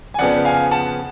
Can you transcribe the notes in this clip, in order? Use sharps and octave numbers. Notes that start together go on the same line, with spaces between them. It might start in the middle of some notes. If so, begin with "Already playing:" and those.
G#5
F2 C#3 F3 B3 D5 F#5
F5 G#5
F#5 A5